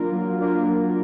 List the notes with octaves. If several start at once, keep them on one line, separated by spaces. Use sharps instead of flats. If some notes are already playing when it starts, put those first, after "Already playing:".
Already playing: F#3 A#3 D4 F4 A#4
F#3
A#3 D4 F4 A#4
F#3